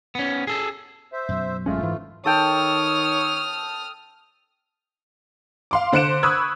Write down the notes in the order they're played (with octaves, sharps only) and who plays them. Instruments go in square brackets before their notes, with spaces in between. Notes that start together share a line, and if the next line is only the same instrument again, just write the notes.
[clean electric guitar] B3 C#4
G#4 A4
[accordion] C5 E5
[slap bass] F#2 B2 F#3
[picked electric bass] G#1 G#3 C#4 [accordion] A3 F4
[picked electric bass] G#2 E3
[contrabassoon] D#3 [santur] A4 G5 [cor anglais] C#5 [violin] D#6 F6
[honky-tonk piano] F5 C6 D6
D3 C5 F#6 C#7 D7 E7
B5 C#6 D#6 E6 F#6 G#6